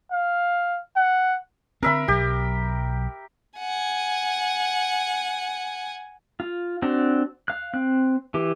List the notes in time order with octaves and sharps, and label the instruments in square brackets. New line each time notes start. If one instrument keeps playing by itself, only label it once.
[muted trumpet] F5
F#5
[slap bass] D3 C4 [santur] A#4 E5 B5
[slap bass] B1 F#3 [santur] G4
[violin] F#5 G#5
[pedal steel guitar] F4
C4 D4 F#4
F5 F#6
C4 F#6
E3 G4